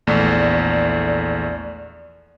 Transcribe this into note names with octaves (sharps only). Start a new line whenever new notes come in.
A#1 E2 A3 D5